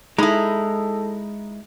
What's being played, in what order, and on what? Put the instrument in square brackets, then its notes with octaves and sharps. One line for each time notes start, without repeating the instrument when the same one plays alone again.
[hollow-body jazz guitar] G#3 [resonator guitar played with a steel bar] D#4 E4 [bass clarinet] A4 [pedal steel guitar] A#5 B5 D#6